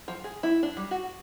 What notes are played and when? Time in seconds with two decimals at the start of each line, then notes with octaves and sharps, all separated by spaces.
0.08 F3
0.24 G#4
0.43 E4
0.63 D4
0.77 G3
0.91 F#4